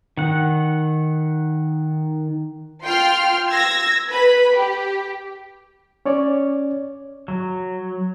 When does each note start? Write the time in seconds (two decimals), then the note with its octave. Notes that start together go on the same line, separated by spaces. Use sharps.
0.17 D#3 F#5
2.84 F4 G5 C6 F6
3.49 E6 G#6 A#6
4.11 B4 B5
4.54 G4
6.06 C#4 C#5 D5
7.28 F#3